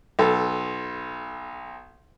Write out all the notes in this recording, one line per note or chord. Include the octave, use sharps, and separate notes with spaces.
B1 A4